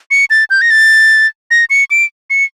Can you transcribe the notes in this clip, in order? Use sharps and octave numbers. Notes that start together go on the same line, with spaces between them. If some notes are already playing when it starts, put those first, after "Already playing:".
C#7
A6
G6
A#6
A6
A#6
C#7
D7
C#7